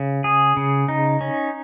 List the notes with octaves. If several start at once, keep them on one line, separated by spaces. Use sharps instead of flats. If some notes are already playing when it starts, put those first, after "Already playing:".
Already playing: C#3
G#4
C#3
D#4
C#4